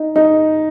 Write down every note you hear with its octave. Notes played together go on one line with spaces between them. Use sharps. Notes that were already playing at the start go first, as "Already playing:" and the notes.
Already playing: D#4
D#4